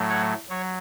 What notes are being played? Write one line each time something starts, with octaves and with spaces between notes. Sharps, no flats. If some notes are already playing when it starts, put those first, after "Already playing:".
Already playing: A2 F#3 A3
C#5 F#5
F#3 C#5